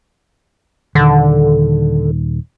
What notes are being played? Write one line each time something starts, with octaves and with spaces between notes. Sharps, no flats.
D#1 D3 D#3